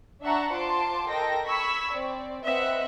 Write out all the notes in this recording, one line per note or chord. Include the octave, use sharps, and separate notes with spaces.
D4 E5 F#5 A5 A#5 C#6
F4 C5 A5 C6 D6
A4 A#4 D#5 G5 A#6
B5 C#6 E6 G#6 B6
C4 D5
C4 B4 D#5 E5 F#5